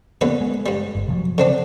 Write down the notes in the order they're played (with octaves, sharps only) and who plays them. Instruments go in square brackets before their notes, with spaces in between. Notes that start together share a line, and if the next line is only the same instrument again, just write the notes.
[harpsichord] D#2 D3 B4 [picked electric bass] A#3 B3
[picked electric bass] G#3
[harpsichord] G2 G3
[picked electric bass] G1
C3 F3 F#3
[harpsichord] D3 C4 D4